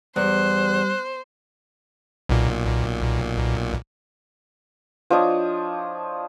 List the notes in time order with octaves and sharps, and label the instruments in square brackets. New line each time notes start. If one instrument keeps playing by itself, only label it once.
[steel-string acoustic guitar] E2 [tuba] G3 [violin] C5 [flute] F#6
[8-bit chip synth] B1 A#2
[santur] F3 D4 C#5 D#5